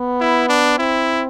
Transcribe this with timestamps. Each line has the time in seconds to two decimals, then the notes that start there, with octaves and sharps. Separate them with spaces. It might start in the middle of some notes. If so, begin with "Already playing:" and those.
Already playing: B3
0.21 E4
0.49 D4
0.78 C4 E4